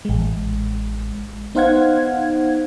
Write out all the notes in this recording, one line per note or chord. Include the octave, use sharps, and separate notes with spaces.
A1 G#3
B3 D#4 C5 F5 F#5 G#6